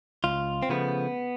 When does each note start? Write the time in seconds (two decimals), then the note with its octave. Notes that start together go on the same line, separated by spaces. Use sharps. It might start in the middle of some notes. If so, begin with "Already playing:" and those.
0.24 C#2 F4
0.63 C4
0.70 C#3 F3 A3 B3